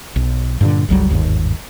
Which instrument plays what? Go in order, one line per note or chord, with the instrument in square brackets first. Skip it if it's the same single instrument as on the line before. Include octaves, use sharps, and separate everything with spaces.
[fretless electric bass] B1
G2 A#2 D3
G1 C#2 F#3 G3
G1 D#2 G#2